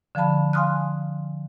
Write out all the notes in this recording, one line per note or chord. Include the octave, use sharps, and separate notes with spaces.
D3 F3 F5 A5 B5
F5 G#5 C6 D#6 F6 F#6